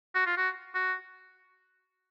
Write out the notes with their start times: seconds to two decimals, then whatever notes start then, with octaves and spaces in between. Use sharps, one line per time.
0.15 F#4
0.26 F4
0.37 F#4
0.75 F#4